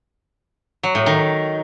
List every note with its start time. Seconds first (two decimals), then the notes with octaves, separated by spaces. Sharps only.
0.83 F#3
0.95 A2
1.06 D#3